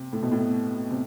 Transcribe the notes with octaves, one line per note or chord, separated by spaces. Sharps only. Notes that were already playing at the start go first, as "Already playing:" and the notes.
Already playing: C3
A2
B2
A2
C3